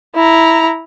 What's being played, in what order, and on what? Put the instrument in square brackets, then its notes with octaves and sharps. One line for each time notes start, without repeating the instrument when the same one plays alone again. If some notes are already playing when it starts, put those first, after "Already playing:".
[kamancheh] E4 A#5